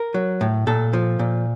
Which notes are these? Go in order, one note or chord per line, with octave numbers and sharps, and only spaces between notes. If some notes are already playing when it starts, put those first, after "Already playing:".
Already playing: A#4
F#3
A2
A#2 A4
F3
A#2